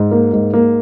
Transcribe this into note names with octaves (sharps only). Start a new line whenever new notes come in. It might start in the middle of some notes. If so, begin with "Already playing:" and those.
Already playing: G#2
A#3
G#2
A#3